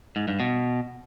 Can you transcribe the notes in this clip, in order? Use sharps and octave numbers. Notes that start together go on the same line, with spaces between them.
G#2
G2
B2